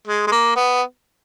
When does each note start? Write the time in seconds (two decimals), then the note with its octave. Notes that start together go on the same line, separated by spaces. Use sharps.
0.07 G#3
0.27 G#3
0.32 A#3
0.56 B3